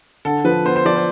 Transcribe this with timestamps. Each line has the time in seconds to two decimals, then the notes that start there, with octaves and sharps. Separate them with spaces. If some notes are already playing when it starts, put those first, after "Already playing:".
0.25 D3 A4
0.44 F3 B4
0.65 B3 C5
0.76 C5
0.85 F3 D5
0.96 C5